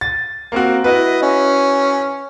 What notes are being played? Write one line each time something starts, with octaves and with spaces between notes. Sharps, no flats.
A6
A#3 C4 F#4
E4 F#4 B4 D#5
C#4